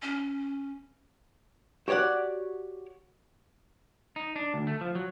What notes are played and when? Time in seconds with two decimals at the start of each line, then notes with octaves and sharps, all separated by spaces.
0.02 C#4
1.88 F#4 G4 C#5 D5 F#5
4.16 D#4
4.36 D4
4.54 D2
4.67 A3
4.81 F3
4.95 F#3